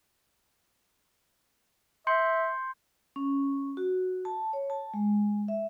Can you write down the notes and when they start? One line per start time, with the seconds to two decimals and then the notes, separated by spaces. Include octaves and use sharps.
2.07 E5 C6 G6 C#7
3.16 C#4
3.77 F#4
4.25 A5
4.53 C#5
4.70 A5
4.94 G#3
5.48 E5